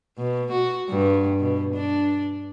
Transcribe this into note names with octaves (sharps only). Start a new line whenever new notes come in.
B2
F#4
G2
B2
D4